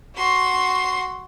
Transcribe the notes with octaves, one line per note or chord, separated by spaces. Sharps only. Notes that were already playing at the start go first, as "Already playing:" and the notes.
F#4 C6